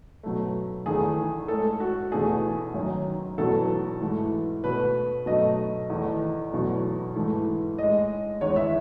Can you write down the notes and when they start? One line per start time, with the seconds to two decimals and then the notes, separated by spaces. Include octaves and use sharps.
0.23 B2 F#3 A3
0.86 E2 D#3 A3 G#4
1.48 A2 G#3 A4
1.80 F#4
2.12 E2 B2 A3 G#4
2.74 F#2 D#3 F#3
3.37 E2 B2 F#3 A4
4.01 G#2 E3 A3
4.64 B2 A3 B4
5.26 B2 F#3 A3 D#5
5.89 E2 D#3 A3
6.52 E2 B2 F#3 A3
7.15 G#2 E3 A3
7.78 A2 G#3 D#5
8.41 E2 D#3 G#3 C#5
8.56 E5